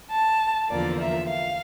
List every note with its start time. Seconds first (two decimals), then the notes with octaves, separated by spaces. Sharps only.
0.11 A5
0.70 E2 D3 F3 A#3 D5
1.00 E5
1.29 F5